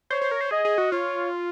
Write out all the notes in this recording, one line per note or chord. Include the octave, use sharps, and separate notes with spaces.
C5 C#5
C5
A#4
C5
G#4 D#5
G#4
F#4
F4 C#5